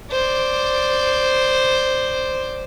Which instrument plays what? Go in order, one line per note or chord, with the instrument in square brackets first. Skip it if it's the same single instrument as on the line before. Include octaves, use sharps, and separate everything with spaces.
[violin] C5 D5